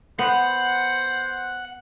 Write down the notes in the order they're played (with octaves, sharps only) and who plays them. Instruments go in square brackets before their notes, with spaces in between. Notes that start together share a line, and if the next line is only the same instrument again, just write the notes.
[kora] B3 [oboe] C5 [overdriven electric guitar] F#5